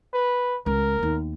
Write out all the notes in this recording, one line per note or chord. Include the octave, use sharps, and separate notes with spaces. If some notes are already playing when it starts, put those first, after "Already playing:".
B4
C#2 A#4
D#2 B3